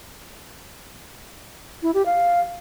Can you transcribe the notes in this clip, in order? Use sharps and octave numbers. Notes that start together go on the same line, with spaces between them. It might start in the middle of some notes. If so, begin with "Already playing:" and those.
E4
G4
F5